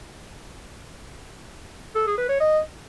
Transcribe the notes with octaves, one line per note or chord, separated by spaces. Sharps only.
A4
G#4
B4
C#5
D#5